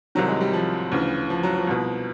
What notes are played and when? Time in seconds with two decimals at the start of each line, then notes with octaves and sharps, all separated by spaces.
0.15 C2 C3 D#3 F#3
0.28 G#3
0.41 G3
0.53 F3
0.92 D2 C#3 E3
1.30 F3
1.43 F#3
1.57 F3
1.67 C2 B2